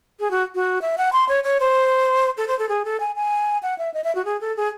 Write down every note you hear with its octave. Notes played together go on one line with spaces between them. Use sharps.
G#4
F#4
F#4
E5
F#5
C6
C#5
C#5
C5
A4
C5
A4
G#4
A4
G#5
G#5
F#5
E5
D#5
E5
F#4
G#4
A4
G#4